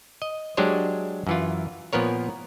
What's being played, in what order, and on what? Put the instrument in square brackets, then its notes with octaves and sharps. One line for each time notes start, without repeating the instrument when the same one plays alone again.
[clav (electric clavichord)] D#5
F#3 G#3 D4 G4 C5 C#5
F#2 E3 F4
A#2 F3 B3 A#4 C#5